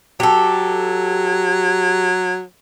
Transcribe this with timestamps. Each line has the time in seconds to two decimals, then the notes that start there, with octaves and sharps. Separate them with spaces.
0.20 F#3 G4 A4